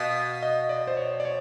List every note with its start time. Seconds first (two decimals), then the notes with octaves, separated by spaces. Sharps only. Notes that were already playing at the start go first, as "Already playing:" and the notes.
Already playing: B2 F5
0.43 D#5
0.69 D5
0.87 C5
0.97 C#5
1.20 D5
1.25 C#5